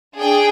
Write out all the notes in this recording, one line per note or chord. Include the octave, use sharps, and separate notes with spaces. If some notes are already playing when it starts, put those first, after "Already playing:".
D4 G#4 G5